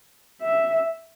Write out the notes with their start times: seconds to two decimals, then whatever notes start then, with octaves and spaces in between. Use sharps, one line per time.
0.41 E5